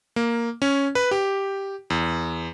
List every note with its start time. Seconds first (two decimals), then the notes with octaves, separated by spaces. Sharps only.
0.16 A#3
0.62 C#4
0.95 B4
1.11 G4
1.90 E2